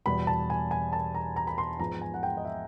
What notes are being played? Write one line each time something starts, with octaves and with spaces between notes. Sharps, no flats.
E2 B2 G3 B5
A5
G#5
G#5
A5
A#5
A#5
B5
C6
G#2 F3 G#3 B3 A#5
G#5
F#5
G5
D#5
E5